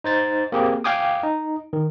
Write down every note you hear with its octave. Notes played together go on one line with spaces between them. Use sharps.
D#4 C5 A6
A#3 C4 G4 G#4
F5 G5 G#5 D6 D#6
D#4
D#3